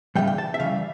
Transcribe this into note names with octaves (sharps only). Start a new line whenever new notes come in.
C#3 E3 G3 G5
G5
A5
E5
C#3 E3 G3 F5